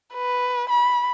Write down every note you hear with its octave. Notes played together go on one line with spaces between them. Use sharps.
B4
B5